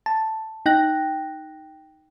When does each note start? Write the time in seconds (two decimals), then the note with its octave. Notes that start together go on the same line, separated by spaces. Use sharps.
0.06 A5
0.66 D#4 G5 F#6 A#6